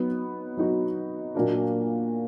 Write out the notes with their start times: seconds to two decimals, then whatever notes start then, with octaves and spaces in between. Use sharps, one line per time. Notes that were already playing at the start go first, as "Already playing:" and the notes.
Already playing: F#3 B3 D#4 F#4
0.57 F#3 B3 D#4 F#4
1.35 A#2 F#3 A#3 D4 F#4